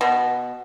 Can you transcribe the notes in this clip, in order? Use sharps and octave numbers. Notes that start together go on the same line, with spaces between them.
B2